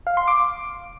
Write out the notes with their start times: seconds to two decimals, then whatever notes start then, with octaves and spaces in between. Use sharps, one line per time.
0.07 F5
0.17 C6
0.28 D6